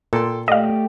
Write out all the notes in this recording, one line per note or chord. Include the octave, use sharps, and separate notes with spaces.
A#2 A4 G5 C6
A3 G4 D5 D#5 F5